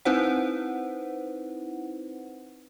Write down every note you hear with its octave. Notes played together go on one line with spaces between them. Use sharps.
C4 D#4 E4 B4 C5 F#5